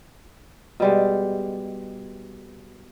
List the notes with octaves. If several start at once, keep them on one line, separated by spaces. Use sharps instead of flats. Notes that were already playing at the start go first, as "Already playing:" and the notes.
B2 G3 G#3